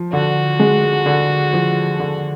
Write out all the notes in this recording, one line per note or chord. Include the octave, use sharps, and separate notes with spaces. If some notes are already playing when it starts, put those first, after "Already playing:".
Already playing: F3
D3 F#4
G#3
D3
F3
D3